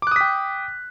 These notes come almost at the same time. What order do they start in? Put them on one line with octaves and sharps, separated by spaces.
D6 F#6 D#6 B6 G5